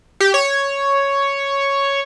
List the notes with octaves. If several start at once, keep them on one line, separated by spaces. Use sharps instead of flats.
G4
C#5